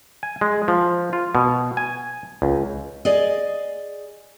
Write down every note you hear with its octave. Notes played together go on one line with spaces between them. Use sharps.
G#5
G#3
F3
F4
B2
G#5
C#2
G#4 D5 D#5